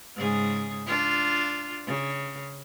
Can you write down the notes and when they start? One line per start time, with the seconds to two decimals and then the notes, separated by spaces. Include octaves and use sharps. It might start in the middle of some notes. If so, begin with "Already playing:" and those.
0.16 G#2 C#3 G#4
0.86 D4 F4
1.86 C#3